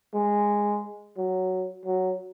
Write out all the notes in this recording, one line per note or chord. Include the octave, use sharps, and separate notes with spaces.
G#3
F#3
F#3